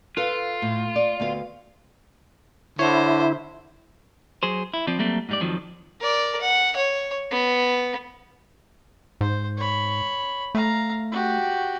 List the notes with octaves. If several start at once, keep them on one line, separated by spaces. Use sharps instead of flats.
F4 A4 B4 F5
A2
D5
D2 B3 F5
D3 E4 C5 C#5
F#3 G#4 C5
E4
F3 C4 D5
F#3 G3 A3 A#3 C4
G#2 G3 D5
F2 D#3 F3 F#3
A#4 D5
F#5
C#5
B3
G#2 C5
C#5 B5
A3 F5 A#5
F#4 G4